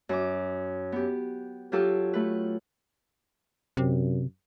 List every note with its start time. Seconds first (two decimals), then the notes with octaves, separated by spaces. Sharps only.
0.09 F#2 D6
0.92 B3 G4
1.72 F#3 F4 G4 A4
2.13 A3 B4
3.77 F#2 C3